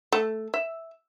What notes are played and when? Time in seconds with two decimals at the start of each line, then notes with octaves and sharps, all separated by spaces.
0.12 A3
0.54 E5